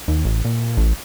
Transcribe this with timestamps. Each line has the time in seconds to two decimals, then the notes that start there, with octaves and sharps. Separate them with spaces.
0.08 D#2
0.25 A1
0.45 A#2
0.77 A1